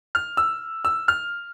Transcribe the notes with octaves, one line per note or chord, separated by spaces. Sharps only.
F6
E6
E6
F6